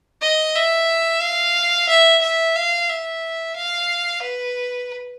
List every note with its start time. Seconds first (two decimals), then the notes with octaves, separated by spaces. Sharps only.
0.22 D#5
0.55 E5
1.22 F5
1.89 E5
2.22 E5
2.56 F5
2.89 E5
3.56 F5
4.23 B4